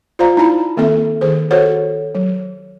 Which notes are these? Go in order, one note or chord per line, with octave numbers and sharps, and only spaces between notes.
F4 C5 D5 F5 A#5
D#4 E4 A5 B5
D#3 A#3 C4 A4 E5
D#3 G#4 C5
F#4 A4 C5 C#5 F#5
F#3